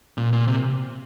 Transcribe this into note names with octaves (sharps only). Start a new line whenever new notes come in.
A#2
A#2
C3